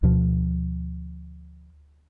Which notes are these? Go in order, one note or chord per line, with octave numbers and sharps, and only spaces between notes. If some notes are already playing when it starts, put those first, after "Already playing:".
D2 B2 F3